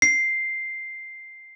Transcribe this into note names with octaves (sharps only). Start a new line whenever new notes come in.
C7